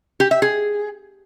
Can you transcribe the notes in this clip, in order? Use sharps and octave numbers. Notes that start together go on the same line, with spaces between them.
G4
E5
G#4